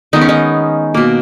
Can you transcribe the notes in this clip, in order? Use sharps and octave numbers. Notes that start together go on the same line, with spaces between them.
D#3 G#3 B3 D#4
C#4
D#4
B2 A#3